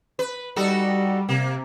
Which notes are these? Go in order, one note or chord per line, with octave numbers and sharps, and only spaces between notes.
B4
G3 D#4 F#4 A4
C3 A#3